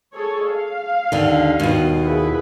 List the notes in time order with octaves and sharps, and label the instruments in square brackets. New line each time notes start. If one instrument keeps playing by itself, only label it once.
[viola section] G#4 A4 C#5
F5
[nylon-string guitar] D#2 D3
D#2 B2
[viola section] E4 G#4 B4